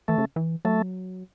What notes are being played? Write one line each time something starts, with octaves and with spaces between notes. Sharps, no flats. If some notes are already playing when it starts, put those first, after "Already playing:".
E3 A3
C#3
E3
F#3 A3